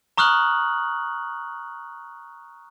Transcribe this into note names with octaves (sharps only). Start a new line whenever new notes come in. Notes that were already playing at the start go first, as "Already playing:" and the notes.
A#5 C#6 D#6 F6 F#6 F#7